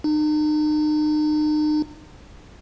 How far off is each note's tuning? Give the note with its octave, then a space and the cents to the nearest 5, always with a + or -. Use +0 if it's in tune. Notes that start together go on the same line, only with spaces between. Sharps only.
D#4 -40